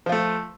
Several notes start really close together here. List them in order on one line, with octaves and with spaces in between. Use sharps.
F3 F4 A3